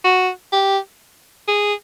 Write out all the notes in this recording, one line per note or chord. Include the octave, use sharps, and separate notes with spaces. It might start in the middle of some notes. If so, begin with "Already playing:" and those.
F#4
G4
G#4